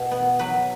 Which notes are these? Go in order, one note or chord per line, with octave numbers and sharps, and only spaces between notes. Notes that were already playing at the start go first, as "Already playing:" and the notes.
Already playing: B2
B3
F#3 B4